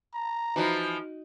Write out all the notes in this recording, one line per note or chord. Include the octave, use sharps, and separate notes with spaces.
A#5
E3 F3 D#4 F#4